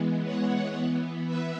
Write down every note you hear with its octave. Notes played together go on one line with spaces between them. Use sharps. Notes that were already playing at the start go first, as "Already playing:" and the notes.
Already playing: E3 G#3 B3
C#5 F#5
E3 B3
B4 E5